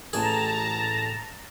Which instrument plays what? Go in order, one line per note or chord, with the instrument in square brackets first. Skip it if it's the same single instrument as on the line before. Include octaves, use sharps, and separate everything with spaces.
[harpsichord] A1 G#4 [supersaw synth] A5 A#5